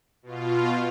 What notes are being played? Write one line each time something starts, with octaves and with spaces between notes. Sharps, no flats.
B2 F4